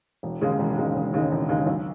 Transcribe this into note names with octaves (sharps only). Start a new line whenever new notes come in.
E1
D#2 C#3 G#3 D#4
E1
D#2 C#3 G#3 D#4
E1
D#2 C#3 G#3 D#4
E1
D#2 C#3 G#3 D#4
B1